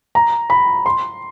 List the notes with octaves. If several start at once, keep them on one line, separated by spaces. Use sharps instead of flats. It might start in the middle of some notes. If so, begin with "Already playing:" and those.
A#5
B5
C6